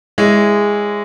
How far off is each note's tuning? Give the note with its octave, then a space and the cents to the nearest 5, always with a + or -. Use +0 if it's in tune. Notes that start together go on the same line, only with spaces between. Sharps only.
G#3 -10 E4 +0 C#5 +0